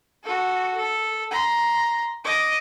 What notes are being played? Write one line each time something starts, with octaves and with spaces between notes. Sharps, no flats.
F#4 A4
A4
A#5 C6
D#5 D6